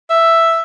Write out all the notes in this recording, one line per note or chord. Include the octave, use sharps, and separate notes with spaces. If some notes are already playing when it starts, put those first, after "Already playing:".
E5